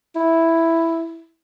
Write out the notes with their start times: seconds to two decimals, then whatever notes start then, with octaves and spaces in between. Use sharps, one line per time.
0.16 E4